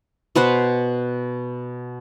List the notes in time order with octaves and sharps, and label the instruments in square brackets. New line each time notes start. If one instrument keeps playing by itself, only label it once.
[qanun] B2 B4 C5 F#5